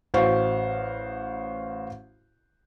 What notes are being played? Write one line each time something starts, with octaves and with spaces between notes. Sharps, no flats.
A1 F#4 C5 F5